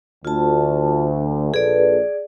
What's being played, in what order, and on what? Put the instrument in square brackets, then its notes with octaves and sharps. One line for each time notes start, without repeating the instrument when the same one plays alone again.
[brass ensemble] D2 [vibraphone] F4 A5
[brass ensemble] A#1 A4 B4 [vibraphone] G#4 D5